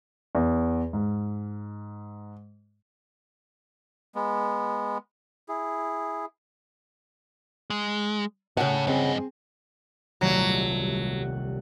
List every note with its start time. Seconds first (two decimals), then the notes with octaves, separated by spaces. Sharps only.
0.35 E2
0.93 G#2
4.15 G#3 B3
5.49 E4 G#4
7.70 G#3
8.57 A2 C#3 F#5
8.87 G2 C4 G#4 D#5
10.21 D#1 C2 F#3 A3